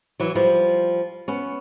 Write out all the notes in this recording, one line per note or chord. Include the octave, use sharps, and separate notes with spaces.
E3 F#3
F3 G3
B3 C#4